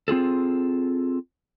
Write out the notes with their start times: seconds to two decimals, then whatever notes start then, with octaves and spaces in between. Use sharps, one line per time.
0.08 C4 F4 G#4 A4